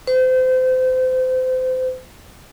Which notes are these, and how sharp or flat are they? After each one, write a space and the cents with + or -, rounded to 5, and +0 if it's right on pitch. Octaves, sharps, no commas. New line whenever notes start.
C5 -30